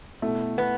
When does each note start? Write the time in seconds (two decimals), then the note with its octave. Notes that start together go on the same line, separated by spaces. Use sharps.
0.22 B2 A3 E4
0.58 B3